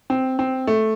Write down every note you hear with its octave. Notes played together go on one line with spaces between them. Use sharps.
C4
C4
A3